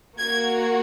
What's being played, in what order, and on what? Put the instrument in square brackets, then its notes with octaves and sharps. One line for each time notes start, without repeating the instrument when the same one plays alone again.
[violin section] A#3 F#4 G#6